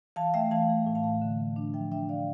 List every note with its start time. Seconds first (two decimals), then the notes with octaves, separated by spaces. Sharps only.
0.16 E3 F5 A5
0.34 A3 E5 G5
0.51 E3 F5 A5
0.69 A3
0.86 A2
0.95 F5 A5
1.04 A3
1.22 D3
1.39 D3
1.56 D4
1.74 F3 E5 G5
1.92 D4 E5 G5
2.09 D3 D5 F5